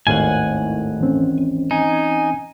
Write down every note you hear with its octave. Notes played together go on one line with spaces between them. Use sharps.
G#1 D#2 A2 F5 F#5 G#5
E3 C4 C#4
D#4 G#5